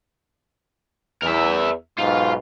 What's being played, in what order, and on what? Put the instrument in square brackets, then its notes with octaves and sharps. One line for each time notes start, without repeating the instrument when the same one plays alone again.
[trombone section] E2 [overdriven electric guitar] A#4 E5
[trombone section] B1 G#2 B2 [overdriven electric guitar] F4